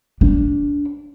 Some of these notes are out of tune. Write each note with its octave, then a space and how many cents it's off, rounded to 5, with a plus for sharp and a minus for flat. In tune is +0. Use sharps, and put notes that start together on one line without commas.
D4 -25